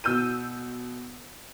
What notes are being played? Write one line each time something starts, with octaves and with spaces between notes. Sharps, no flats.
B2 E6 G6 D#7